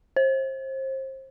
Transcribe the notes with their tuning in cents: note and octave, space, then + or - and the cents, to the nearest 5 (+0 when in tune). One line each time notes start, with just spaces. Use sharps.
C5 +30